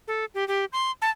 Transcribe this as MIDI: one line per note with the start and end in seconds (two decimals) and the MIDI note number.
0.08 0.25 69
0.35 0.47 67
0.48 0.65 67
0.73 0.91 84
1.02 1.10 81